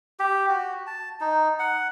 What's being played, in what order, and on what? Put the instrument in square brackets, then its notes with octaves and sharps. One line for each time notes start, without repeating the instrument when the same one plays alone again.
[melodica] G4
F#4
A5
D#4
F#5